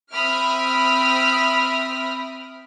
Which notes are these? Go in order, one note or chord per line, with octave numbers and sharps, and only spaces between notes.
C4 E5 B5 D#6 F6 D7